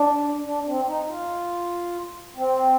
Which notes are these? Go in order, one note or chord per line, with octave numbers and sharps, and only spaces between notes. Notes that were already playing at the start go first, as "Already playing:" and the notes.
Already playing: D4
D4
C4
D#4
F4
C4